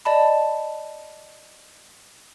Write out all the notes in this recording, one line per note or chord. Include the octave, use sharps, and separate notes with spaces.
D5 D#5 A5 B5